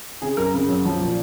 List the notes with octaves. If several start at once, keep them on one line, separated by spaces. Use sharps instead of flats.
C#3 G#4
F#2 A#4
C#3
F#2
F3
A#2